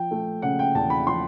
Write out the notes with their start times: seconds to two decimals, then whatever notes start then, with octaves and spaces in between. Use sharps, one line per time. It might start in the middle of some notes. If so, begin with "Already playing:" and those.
Already playing: F3 G5
0.11 A3
0.42 C#3 F#5
0.59 G5
0.75 E2 A5
0.90 B5
1.06 F3 C6